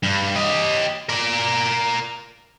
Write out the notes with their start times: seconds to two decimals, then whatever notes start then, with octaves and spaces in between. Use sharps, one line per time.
0.03 G2
0.36 G4 D#5
1.09 A#4 D5